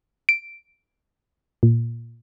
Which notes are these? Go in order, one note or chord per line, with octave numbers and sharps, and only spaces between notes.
D7
A#2